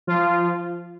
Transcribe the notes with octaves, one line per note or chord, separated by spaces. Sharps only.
F3 F4